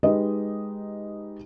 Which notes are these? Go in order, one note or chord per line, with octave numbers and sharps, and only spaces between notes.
G#3 D#4 G4 B4 D#5